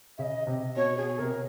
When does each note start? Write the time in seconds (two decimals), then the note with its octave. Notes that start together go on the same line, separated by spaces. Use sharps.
0.18 C#3 E5
0.23 D#5
0.47 C3
0.76 B2 C#5
0.97 B2 G#4
1.19 C3 A#4